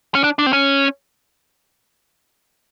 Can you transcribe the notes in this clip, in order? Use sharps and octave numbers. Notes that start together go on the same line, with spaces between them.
C#4
D4
D4
C4
C#4